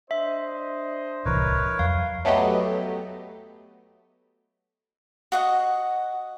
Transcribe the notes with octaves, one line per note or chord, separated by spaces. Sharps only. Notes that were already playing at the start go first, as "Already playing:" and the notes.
D4 C5 D#5 E5
D1 C2 E3 A#4 B4 C#5
F2 F#3 F5
F#3 A3 B3 G4 D#5
F#4 D#5 F#5